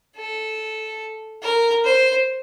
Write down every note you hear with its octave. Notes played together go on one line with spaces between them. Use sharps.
A4
A#4
C5